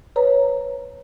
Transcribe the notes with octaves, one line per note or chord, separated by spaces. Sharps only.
B4 C#5 A#5